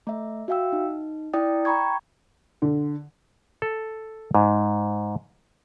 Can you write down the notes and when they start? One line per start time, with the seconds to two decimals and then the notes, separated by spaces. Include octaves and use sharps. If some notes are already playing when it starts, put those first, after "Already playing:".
0.07 A3 E5
0.48 F#4 E5 F5 G5 E6
0.73 D#4
1.33 E4 D5 G5 D#6 A6
1.65 G5 A#5 B5 C#6 G#6
2.62 D3
3.62 A4
4.35 G#2